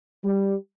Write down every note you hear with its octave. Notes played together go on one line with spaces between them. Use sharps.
G3